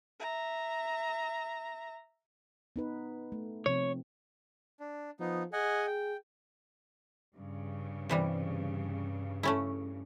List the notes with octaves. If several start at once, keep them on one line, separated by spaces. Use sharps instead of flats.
E5 A#5
B3 D#4 B4
A3
C3 F3 C4 C#5
D4
F3 B3 D#4
G#4 D#5 F#5 G#5
G5
G2 C#3
C3 E3 G3
A3 C#4 E4